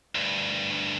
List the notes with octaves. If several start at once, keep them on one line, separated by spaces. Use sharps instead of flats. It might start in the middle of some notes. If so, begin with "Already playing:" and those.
D2 G2